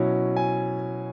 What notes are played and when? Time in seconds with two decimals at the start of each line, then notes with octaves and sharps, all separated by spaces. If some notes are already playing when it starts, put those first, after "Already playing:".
Already playing: B2 F#3 C#4 E4
0.36 G#5